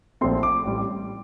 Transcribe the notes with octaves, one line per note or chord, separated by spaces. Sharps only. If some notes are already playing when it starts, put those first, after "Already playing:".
A#1 A#2 F3 A3 C4 C6
D6
A1 A2 G3